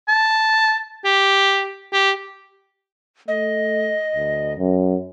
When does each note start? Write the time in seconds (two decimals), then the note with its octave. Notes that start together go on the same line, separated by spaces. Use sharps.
0.08 A5
1.05 G4
1.93 G4
3.28 A3 D#5
4.16 D2
4.58 F#2